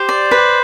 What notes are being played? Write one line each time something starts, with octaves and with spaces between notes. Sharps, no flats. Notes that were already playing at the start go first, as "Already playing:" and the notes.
Already playing: G4 C5
D5
B4